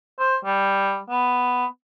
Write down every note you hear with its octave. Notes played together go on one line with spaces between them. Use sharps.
C5
G3
B3